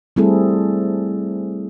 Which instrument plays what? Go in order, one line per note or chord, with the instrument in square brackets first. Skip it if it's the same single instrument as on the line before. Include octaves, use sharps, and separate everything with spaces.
[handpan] G3 A3 C4 E4 G#4 A4